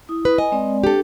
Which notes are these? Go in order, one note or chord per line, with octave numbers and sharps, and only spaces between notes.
E4 D#6
B4
D#5 G#5
G#3 C4 D5
D4 G4 A4